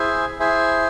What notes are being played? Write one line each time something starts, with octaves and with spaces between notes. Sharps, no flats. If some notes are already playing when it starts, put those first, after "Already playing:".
Already playing: E4 G#4 C5 E5 G#5
E4 G#4 C5 E5 G#5